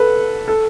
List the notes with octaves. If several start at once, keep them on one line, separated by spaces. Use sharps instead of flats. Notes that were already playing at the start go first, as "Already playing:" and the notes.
Already playing: A4 B4
A4